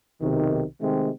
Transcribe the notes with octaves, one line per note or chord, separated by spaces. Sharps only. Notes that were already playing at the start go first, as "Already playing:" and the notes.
B1 C3 D#3
C3 D#3 G#3 A3 C4